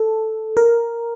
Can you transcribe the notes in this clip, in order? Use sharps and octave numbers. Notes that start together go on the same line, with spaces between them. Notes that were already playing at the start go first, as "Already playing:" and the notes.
Already playing: A4
A#4